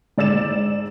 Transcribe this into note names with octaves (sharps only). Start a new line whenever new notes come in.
G#2 D5 E6 A6 E7